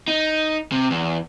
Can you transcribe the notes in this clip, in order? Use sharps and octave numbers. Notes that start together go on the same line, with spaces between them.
D#4
C3
E2